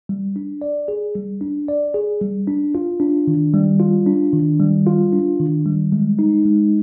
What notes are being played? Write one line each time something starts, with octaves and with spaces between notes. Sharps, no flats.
G3
D4
D5
G#4
G3
D4
D5
G#4
G3
D4
F4
D4
D#3
G3
F4
D4
D#3
G3
F4
D4
D#3
G3
G#3
D#4
G#3